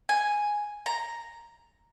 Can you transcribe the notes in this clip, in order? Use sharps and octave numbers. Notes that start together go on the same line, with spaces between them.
G#5
A#5